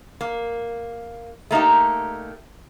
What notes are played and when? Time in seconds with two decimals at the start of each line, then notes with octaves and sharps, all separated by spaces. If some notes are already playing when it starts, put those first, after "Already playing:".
0.21 A#3
1.51 A3 A#3 D#4 G4